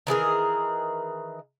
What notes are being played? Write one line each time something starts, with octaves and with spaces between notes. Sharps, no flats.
D#3 E3 G#4 A#4